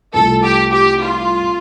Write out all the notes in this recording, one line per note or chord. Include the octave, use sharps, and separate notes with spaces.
C2 C3 F3 A3 A4
G4
G4
F4